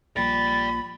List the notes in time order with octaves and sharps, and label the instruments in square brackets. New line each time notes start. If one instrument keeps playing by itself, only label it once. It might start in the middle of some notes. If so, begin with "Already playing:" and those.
[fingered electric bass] A#1 A#2 [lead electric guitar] D5 G5 [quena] B5 [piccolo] A6